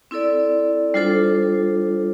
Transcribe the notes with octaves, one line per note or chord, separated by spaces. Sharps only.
C4 E4 A4 D5
G3 D4 F4 A4 C5